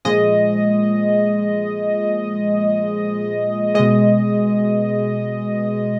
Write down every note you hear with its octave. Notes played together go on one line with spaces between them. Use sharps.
A#2 F3 G#3 D#5
B2 G#3 D#5